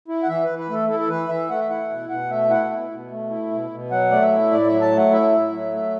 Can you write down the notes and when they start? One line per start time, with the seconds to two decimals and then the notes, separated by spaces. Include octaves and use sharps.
0.08 E4
0.23 F#5
0.28 E3 E5
0.44 E3 B4
0.59 B4
0.69 A3 A4
0.89 E4 A4
0.99 A4
1.08 E3 B4
1.28 E3 E5
1.49 A3 F#5
1.59 E5
1.69 E4 F#5
1.90 B2
2.09 B2 F#5
2.30 A3 E5
2.50 E4 F#5
2.71 B2
2.91 B2
3.11 A3
3.30 E4
3.51 B2
3.71 B2
3.91 F#3 F#5
4.11 A3 D5
4.22 E5
4.32 E4
4.51 A2 D5
4.67 F#3 E5
4.81 A5
4.91 A3
4.97 F#5
5.11 E4 E5
5.32 A2
5.52 F#3
5.72 A3